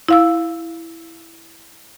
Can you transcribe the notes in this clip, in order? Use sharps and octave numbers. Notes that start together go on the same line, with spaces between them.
E4 F5 E6